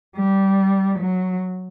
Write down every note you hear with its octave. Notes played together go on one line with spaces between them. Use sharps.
G3
F#3